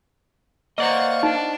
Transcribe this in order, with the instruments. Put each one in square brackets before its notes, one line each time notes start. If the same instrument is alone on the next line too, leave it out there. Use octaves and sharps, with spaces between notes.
[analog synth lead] A#3 [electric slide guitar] C5 D5 D#5 [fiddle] F#5 C#6
[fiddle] D4 [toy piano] D#4